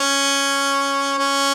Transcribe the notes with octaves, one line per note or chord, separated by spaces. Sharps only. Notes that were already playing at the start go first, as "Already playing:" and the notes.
Already playing: C#4
C#4